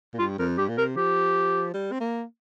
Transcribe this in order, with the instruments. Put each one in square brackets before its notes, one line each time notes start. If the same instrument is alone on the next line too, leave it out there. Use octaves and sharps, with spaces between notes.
[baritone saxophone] A#2
[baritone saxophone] G2 [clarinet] F4
[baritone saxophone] F2 [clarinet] A#4
[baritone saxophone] G2 [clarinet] G4
[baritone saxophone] A#2
[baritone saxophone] C3 [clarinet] A#4
[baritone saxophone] F3 [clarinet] G4
[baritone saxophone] G3
C4
A#3